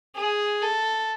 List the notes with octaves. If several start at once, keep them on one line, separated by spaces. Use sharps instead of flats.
G#4
A4